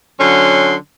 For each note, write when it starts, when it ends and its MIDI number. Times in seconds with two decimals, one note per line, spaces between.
0.20 0.76 50
0.20 0.76 54
0.20 0.76 61
0.20 0.76 84